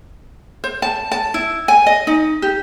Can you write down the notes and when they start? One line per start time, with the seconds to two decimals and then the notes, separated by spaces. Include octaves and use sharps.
0.64 C5
0.82 A5
1.11 A5
1.34 E4
1.68 G#5
1.86 D#5
2.07 D#4
2.42 G4